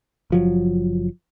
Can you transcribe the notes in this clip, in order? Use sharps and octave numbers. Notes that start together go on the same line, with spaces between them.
F#1 F3 F#3